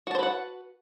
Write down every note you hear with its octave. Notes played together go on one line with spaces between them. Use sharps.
F#4 B4 C5 F#5 A5